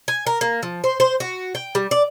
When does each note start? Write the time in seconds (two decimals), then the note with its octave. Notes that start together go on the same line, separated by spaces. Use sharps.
0.08 G#5
0.27 A#4
0.41 A#3
0.63 F3
0.84 C5
1.00 C5
1.20 F#4
1.55 G5
1.75 G3
1.91 D5